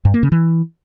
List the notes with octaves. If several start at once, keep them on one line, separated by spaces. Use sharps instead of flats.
G2
A#3
C#3
E3